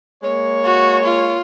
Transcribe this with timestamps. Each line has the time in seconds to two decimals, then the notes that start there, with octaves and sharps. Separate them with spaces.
0.23 G#3 A#3 C#5
0.65 F#4
1.05 F4